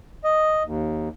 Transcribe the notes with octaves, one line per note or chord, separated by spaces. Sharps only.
D#5
D#2